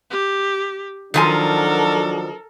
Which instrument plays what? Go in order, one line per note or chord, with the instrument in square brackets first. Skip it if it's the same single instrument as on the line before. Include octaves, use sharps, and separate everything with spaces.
[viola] G4
[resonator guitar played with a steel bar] D#3 F3 G#5 [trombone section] F#3 D4 [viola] A4 A#4